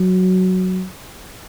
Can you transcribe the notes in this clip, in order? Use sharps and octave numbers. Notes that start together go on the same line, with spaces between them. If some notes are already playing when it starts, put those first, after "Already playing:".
Already playing: F#3